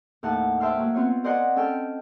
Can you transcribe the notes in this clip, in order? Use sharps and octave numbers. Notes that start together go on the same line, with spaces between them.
D#2 A2 F#5 A5
C5 E5 G5 A5 C6 F6
F#3 A#3
B3 C4 F4 C#5
A#4 C5 D5 D#5 F#5 G#5
C#4 A4 G5 F6